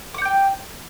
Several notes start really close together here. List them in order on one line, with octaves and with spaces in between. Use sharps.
D6 F#5 G6 G5